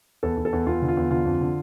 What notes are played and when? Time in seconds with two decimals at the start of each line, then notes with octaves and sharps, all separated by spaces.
0.23 E2 A4
0.37 E2
0.45 A4
0.53 E2
0.66 E2 F4
0.82 D3
0.88 F4
0.97 E2
1.11 D3 F4
1.26 F2
1.41 D3